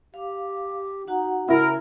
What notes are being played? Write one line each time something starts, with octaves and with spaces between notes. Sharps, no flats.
G4 F5
D#4 F#4 F#5
C#3 E4 A#4